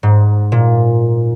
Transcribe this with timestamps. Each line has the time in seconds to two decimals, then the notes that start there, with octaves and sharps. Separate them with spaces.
0.03 G#2
0.52 A#2